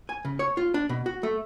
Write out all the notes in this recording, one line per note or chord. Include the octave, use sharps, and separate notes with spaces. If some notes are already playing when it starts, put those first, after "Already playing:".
G#5
C#3
C#5
F4
D4
B2
F#4
A3